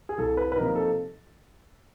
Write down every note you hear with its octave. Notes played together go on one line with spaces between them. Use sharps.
G#4
C2 A4
B4
B4
C3 F3 A#3 D#4 A#4
A4